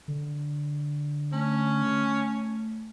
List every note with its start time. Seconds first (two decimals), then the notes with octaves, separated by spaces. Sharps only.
0.08 D3
1.33 A3 C#4